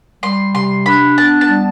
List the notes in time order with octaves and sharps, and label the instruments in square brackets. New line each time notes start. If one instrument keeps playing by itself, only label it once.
[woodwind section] G3 [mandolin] C6
[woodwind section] C3 [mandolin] C6
[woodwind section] D4 [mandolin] B5
[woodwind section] B3 [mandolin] A5
[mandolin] A5
[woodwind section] G3